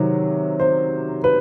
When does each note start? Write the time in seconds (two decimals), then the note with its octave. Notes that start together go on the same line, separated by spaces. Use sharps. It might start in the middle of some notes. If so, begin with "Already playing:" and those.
Already playing: C3 D#3 F#3
0.60 C5
1.24 B4